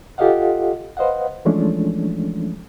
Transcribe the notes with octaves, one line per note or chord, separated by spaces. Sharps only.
F4 G4 A4 D#5 F5 F#5
B4 C5 D#5 F5 F#5
E3 F3 G#3 A3 C#4 D4